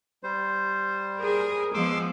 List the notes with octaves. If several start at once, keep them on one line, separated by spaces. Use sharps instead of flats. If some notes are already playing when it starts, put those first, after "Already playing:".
G3 C5
G#4 A#4
F3 G#3 B3 C6 D6 E6